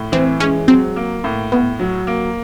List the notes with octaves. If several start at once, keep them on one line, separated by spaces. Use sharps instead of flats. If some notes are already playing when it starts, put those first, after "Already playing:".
Already playing: A2
E3 C4
G#3 C#4
F#3 C4
A#3
A2
A2 B3
F#3
A#3